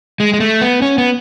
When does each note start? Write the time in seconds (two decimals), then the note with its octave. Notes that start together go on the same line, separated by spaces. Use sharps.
0.20 G#3
0.33 G#3
0.40 A3
0.61 B3
0.82 C#4
0.98 B3